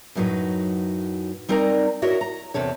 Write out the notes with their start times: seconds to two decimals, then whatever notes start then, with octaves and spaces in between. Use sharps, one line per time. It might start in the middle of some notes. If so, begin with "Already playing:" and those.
0.15 F#2 A2 F#3 D#4 B4
1.48 G3 C4 D#4 A#4 D5 A#5
2.02 E4 F#4 A#4 C#5 D#5
2.21 A#5
2.54 E2 C3 A4 C#5